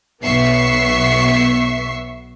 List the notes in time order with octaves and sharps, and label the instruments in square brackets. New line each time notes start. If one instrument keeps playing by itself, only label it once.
[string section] B1 B3 E5 C#6 C7